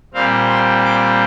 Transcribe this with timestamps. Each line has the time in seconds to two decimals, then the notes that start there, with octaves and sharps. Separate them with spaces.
0.14 A#2 G3 C4 F5
0.49 C6
0.85 D6